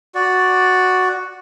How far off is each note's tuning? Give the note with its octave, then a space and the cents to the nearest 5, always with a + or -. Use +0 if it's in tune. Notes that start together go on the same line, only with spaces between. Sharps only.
F#4 +0 D5 +0